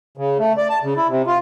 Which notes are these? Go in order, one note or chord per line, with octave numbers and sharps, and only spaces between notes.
C#3
A3
D5
A5
C#3
E4
C3
F4